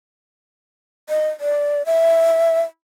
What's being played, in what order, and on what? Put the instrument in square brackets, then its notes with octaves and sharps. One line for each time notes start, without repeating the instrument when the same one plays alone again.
[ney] D#5
D5
E5